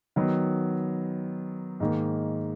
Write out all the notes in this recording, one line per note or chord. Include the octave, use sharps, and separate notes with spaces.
D#3 F#3 B3
G#2 D#3 A#3